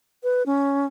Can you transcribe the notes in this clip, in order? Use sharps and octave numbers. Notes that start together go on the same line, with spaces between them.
B4
C#4